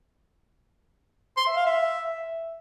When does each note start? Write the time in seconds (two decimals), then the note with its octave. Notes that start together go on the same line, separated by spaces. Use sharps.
1.37 C6
1.47 E5
1.56 F5
1.66 E5